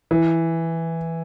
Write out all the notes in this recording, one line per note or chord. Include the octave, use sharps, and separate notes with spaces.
E3